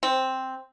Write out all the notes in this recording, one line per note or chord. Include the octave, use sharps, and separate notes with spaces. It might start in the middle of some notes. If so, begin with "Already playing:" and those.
C4